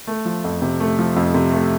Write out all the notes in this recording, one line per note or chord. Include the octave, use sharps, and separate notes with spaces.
A3
F3
F2
C3
A3
F3
F2
C3
A3